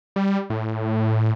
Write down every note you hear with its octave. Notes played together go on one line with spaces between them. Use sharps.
G3
A2